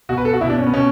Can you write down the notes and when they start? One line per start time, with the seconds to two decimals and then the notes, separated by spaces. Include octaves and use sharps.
0.09 B2 F#4
0.18 B4
0.25 A4
0.33 F#4
0.41 B2 E4
0.50 D4
0.58 C#4
0.66 B3
0.74 B2 C#4